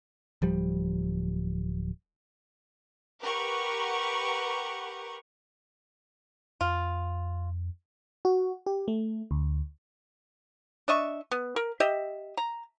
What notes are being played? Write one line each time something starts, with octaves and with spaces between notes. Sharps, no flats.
D1 F3 G3
G4 A#4 B4 F#5 C#6
F2 F4
F#4
G4
A3
D2
D4 D#5 E5 C#6
B3
A#4
G4 D#5 E5
A#5